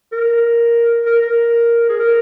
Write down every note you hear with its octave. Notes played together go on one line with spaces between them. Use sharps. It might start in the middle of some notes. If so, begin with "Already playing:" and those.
A#4
A#4
A#4
G#4
A#4